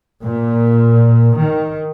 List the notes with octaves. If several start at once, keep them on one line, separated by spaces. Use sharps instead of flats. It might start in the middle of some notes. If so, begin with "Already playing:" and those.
A#2
D#3